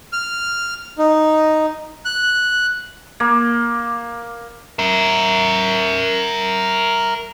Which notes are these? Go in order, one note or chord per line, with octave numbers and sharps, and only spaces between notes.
F6
D#4
F#6
A#3
A#4 E5